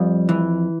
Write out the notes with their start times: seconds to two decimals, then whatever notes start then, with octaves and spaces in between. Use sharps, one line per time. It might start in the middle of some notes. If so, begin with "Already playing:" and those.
Already playing: F2 G3
0.29 E3